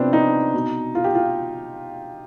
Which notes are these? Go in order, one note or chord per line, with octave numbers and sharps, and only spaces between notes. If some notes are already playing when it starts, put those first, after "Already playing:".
Already playing: C3 F3 B3 C4 D4
D#4
B2
F4
G4
F4